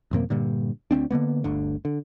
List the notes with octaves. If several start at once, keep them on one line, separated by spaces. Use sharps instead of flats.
A1 F#2 C3 A#3
G2 A#2 D3
D2 B3 C4 D4
D3 F3 A#3 B3
G1 D2 D3
D3